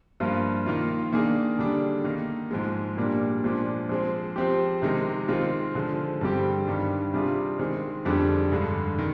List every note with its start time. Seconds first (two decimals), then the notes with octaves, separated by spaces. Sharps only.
0.20 G2 F3 A#3 F4
0.66 D#3 A#3 F4
1.13 D#3 A#3 D4 G#4
1.59 D3 G3 D4
2.04 D#3 A#3 D#4
2.51 G#2 F3 G#3
2.97 A#2 G3 A#3 D4
3.44 A#2 F3 G#3 D4
3.89 F3 G#3 C4
4.36 F3 C4 G4
4.82 C3 D#3 G#3 D#4
5.28 D#3 G#3 C4 F4
5.75 D3 F3 G#3
6.21 G2 D3 G3 C4 G4
6.67 G2 D#3 G3 D4
7.13 C3 G3 D4 F4 G#4
7.59 D#3 G#3 C4
8.05 F2 D3 G3 D4 G#4
8.52 G2 D3 G#3
8.98 D#3